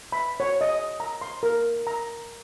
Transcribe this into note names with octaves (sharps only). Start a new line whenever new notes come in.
B5
C#5
D#5
A#5
C6
A#4
A#5